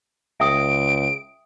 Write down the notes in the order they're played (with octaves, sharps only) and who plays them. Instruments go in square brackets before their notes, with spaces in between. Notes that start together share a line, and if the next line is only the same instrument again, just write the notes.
[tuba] C#2 [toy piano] E5 G5 D#6 [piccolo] D7